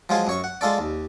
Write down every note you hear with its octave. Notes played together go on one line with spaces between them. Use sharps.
F3 F#3 G#3 F4 G#5
F#2 C#5 C#6
F#5
G#3 F4 A4 D5
D#2